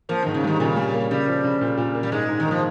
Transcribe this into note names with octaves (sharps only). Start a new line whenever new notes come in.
F3 A#3
G#2 D#3
C#3
D#3 G3
A#2 C#3
G3
A#3
C#3 G3
F3
C#3
A#2
A#2
A#3
G3
G#2 G#3
G#2
D#3
A#3
F3